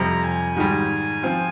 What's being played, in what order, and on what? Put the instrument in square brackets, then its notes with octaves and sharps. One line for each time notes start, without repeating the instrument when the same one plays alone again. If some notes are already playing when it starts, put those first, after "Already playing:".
Already playing: [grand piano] F2 C3 G3 [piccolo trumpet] A#5
[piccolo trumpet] G#5
[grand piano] G#2 D#3 G3
F3 C4 F4